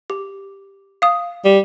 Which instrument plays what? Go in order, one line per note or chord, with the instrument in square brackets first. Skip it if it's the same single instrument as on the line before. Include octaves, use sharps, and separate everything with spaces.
[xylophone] G4
F5 D#6
[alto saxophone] G3